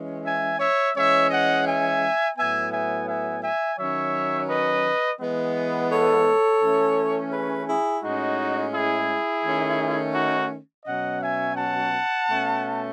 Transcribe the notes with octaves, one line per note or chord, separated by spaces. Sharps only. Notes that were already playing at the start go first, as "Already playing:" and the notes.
Already playing: E3 G#3 C#4
E5 G#5
C#5 E5
E3 G#3 C#4 C#5 E5
D#5 F#5
E5 G#5
A2 F#3 B3 E5 G#5
E5 G#5
E5 G#5
E5 G#5
D#3 F#3 C#4 C#5 E5
B4 D#5
E3 G#3 B3
A4 C#5
E3 A3 C#4
G#4 B4
E4 G#4
A2 G#3 C#4 D#4 F#4
E4 G#4
D#3 A3 C#4
D#4 F#4
B2 F#3 C#4 D#5 F#5
E5 G#5
F#5 A5
B2 A3 C#4